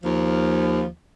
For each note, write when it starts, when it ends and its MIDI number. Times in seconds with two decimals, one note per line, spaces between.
0.04 0.86 39
0.04 0.86 53